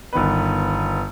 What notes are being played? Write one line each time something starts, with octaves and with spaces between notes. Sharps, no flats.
G1 D#3 B3 B4